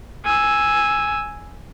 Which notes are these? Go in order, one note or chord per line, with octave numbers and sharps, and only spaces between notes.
G#5 E6